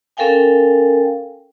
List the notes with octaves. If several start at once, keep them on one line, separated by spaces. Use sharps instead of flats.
C#4 A4 A#4 F5 G5 G#5